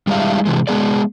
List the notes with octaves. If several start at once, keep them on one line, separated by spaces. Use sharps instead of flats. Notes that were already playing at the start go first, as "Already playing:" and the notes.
G3 G#3 D4 E4 E5 F5
C3 E3 G#3
G#3 B3 G#4 D5